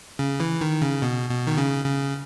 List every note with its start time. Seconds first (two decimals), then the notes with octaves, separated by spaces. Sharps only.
0.19 C#3
0.40 E3
0.61 D#3
0.82 C#3
1.02 B2
1.30 B2
1.47 D#3
1.57 C#3
1.84 C#3